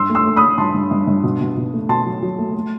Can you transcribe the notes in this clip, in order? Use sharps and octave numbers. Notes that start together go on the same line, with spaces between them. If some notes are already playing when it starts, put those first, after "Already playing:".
Already playing: G2 C6 E6
A3
C6 E6
A3
B5 D#6
A3
G2 A5 C6
G2
G2
G2
B2
B2
B2
A3
B2 A5 C6
F#3
F#3
A3
A3